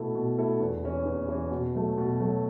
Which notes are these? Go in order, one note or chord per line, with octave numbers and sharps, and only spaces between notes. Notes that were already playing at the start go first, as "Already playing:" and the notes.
Already playing: B2 A3 E4 A4
B2
A3 E4 A4
E2
E3 C#4
E2
E3 C#4
B2
F#3 A3
B2
F#3 A3